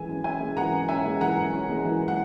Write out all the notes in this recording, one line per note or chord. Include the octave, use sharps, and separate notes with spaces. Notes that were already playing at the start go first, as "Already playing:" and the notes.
Already playing: E3 G#3 C#4 E5 G#5
F#2
C#4 E5 G#5
G#3
E3 F#5 A#5
F#2
C#4 E5 G#5
G#3
E3 F#5 A#5
F#2
C#4
G#3
E3
F#5